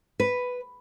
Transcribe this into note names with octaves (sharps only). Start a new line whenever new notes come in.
B4